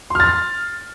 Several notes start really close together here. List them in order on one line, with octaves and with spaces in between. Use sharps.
C6 F6 A6